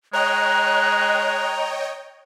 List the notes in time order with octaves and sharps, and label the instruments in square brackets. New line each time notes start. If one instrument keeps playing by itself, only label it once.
[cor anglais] G#3 [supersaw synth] C#5 D#5 G5 [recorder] A#5 [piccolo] F#6